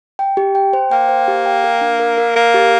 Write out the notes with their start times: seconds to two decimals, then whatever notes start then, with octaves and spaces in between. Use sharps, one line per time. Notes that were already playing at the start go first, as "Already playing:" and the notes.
0.19 G5
0.37 G4
0.55 G5
0.73 C5
0.91 A#3 G5
1.09 C5
1.28 G4
1.46 G5
1.64 A#4
1.81 D4
1.99 A#4
2.17 A#4
2.36 A#3 A#4
2.54 G4